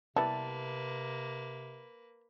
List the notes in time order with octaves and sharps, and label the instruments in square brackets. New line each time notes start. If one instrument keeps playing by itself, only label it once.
[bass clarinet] C3 [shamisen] G3 B3 E4 [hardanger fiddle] A#3 B4 [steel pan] A5